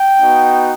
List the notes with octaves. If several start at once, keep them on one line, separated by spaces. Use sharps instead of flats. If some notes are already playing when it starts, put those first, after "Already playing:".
Already playing: G5
B3 D#4 F#4